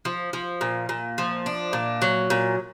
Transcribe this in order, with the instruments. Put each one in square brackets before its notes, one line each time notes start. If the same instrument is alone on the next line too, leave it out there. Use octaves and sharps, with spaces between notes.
[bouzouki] F3
F3
A#2
A#2
F3
D4
A#2
F#3
A#2